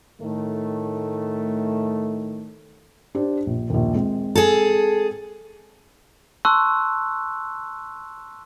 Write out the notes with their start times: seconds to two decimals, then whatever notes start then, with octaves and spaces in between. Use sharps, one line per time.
0.21 A2 D#3 A3
3.15 D4 G4 C5
3.46 A#1
3.70 A#1 D#2
3.95 G#3 C4
4.35 G#4 A4
6.45 A5 C6 C#6 E6 F#6